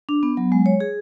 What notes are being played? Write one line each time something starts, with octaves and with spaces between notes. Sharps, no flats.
D4
B3
F#3
G#3
C#5
G#4